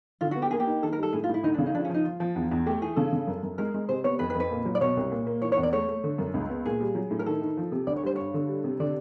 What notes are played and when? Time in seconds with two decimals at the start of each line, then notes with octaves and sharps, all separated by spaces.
0.21 D3 F4
0.31 B3 F#4
0.42 G4
0.51 A#3 G#4
0.60 G4
0.67 D#4
0.83 D#3 A4
0.93 A#4
0.98 G3 A4
1.13 A2 G#4
1.24 F4
1.29 A2
1.34 E4
1.43 D2 D#4
1.54 C#3 D4
1.66 D#4
1.74 F3 D4
1.85 C#4
1.89 F3 D#4
2.05 F3 F4
2.20 F3
2.36 E2
2.51 E2
2.66 A3 G4
2.82 E3 G#4
2.96 C#3 A4
3.13 C#3
3.27 F#2
3.43 F#2
3.58 G#3 A#4
3.74 G#3
3.89 C3 C5
4.04 B3 C#5
4.19 F2 B4
4.30 B4
4.35 F2
4.40 B4
4.51 A#2
4.65 F#3
4.75 D5
4.81 B2 C#5
4.97 C2
5.11 A#2
5.27 A#3
5.42 E3 C#5
5.52 C#5
5.57 E2
5.63 D5
5.73 A3 C#5
5.88 A3
6.04 D3
6.18 F#2
6.34 C#2
6.50 B3
6.65 A#2 G#4
6.81 G3
6.95 F#3
7.11 A2
7.19 A#4
7.26 D#3 A4
7.42 D#3
7.57 F3
7.72 C3
7.87 D2 D5
7.96 C#5
8.03 G3 C5
8.16 G2 C#5
8.34 D3
8.48 G3
8.64 C3
8.80 D3 D5